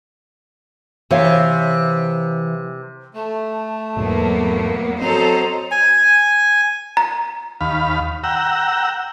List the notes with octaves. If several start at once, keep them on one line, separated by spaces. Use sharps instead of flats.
C3 E3 C#5 F5
A3 A5
E2 G#2 B2 F#3 A#3 B3
F#3 C4 A4 C5 D#5 A#5
G#5
A#5
D#2 F5 B5
F#5 G5 A#5 E6